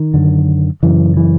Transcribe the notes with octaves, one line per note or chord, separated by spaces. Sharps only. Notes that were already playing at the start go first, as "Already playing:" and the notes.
Already playing: D#3
F#2 D3
F#2 C#3 E3
E3